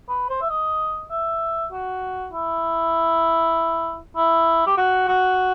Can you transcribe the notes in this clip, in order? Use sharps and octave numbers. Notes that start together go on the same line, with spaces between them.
B4
C5
E5
D#5
E5
F#4
E4
E4
G4
F#4
F#4